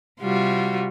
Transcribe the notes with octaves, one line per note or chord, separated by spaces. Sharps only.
C3 G3 F4 F#4